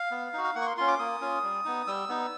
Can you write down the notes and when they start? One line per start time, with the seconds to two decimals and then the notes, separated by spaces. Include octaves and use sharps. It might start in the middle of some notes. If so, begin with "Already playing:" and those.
Already playing: F5
0.11 B3
0.33 D#4 F#4
0.44 F5
0.55 A#3 F#5
0.61 C#6
0.66 C6
0.77 C#4 F4 C6
0.88 D6
0.99 A#3 D#6
1.21 C#4 F4
1.43 G3
1.65 B3 D#4
1.87 G3 E6
2.09 B3 D#4